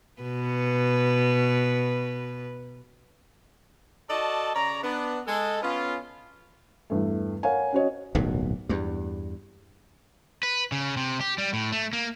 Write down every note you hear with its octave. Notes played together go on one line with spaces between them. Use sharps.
B2 B4
F#4 A4 D5 D#5 A5
C#3 C#5 D5 A#5
B3 D4
G#3 A4
B3 C#4 F4
E2 G2 A3
A#4 C#5 F5 F#5 G#5
C#4 F#4 C#5 D#5
D1 B1 G2 A#2
E2 G2
B4
C#3
C3
G4
G3
A2
A3
A#3